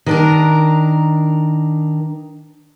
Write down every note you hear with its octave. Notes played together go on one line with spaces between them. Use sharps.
D#3 D4 A#4